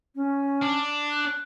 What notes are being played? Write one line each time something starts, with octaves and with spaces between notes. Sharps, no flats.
C#4
D4
F#6